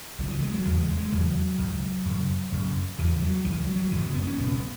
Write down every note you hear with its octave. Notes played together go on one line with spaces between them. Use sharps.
C#2 C#3 F#3
E3
G#3
F#3
E2 C#3 F#3
G#3
G#3
E2 C#3 F#3
C#2 C#3
F#2 C#3
F#2 C#3
E2 C#3 E3
F#3
C#2 C#3 E3
F#3
F#3
F#2 C#3 E3
F#3
B3
C#4
C#2 B2 B3
B3